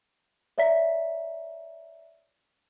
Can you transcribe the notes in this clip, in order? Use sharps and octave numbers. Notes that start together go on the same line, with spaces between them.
C#5 D5 E5 A#5 B6